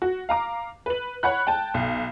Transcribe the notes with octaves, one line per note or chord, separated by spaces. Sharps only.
F#4
F5 A#5 D6
B4 F#7
C#5 F#5 B5 F#6
G5 A5
B1